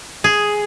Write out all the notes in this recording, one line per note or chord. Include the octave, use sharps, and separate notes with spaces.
G#4